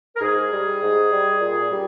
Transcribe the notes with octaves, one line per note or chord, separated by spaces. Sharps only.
A#4
G#2 G#4
G3
G#2
G3
A#2
G3